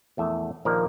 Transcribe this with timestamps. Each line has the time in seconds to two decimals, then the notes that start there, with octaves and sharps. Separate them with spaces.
0.17 A#1 E2 A3 E5
0.65 A#1 D#3 F3 A#3 A#4 D5